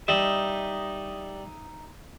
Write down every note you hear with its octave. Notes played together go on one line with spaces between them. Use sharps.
G3 D#4 D#5 E5